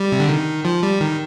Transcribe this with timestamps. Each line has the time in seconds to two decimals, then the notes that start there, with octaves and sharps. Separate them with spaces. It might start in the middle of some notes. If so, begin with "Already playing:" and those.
Already playing: G3
0.12 C3
0.20 D3
0.28 D#3
0.65 F3
0.83 G3
1.01 D#3